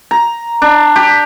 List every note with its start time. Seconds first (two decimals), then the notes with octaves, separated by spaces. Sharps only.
0.11 A#5
0.62 D4
0.96 G4